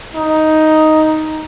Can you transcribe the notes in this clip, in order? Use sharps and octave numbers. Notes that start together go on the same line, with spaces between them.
D#4